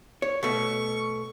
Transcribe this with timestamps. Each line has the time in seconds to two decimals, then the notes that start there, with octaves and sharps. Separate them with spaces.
0.22 C#5
0.43 B2 A3 C#6